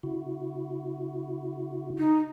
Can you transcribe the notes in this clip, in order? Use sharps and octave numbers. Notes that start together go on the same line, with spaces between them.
C#3 E4 F#4
D#4